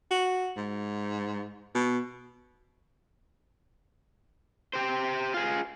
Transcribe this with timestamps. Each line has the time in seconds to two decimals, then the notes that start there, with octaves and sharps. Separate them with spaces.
0.11 F#4
0.57 G#2
1.75 B2
4.73 G4 C5
5.34 F4 G#4